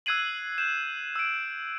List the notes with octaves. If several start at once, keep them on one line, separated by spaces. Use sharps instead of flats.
E6 F#6 G#6 C7 D#7 F#7
G6 E7
E6 D7